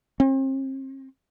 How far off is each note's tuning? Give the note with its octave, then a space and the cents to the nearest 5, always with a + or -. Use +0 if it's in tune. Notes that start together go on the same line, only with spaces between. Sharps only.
C4 +40